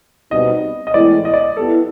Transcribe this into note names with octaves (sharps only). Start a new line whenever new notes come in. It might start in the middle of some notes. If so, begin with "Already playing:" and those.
B2 G3 C4 D#4 D#5
D#5
A2 E3 G#3 B3 E4 D5
D#5
D5
D#5
G3 B3 E4 A4